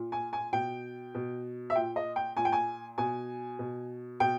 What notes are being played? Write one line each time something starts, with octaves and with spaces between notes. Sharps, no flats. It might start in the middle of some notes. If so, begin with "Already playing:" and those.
Already playing: A#2
G#5
G#5
B2 G5
B2
E5
A#2 G5
D#5
G5
A#2 G#5
G5
G#5
B2 G#5
B2
B2 G5